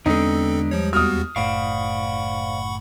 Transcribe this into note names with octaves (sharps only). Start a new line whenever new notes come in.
E2 D3 G#3 B3 C4 D4 D#4 A4
F3 G3 C#5
D#2 B3 F#4 D#6 F6
F#1 A2 C5 D5 F5 F#5 B5 C#6